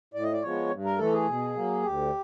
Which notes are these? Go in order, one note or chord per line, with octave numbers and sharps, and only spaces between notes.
A2 D5
D#5
D5
F3 G#3 B3 C#5
G2
A#4
E3 A3 A4
G#4
B2
F#3 A#3
D2 G4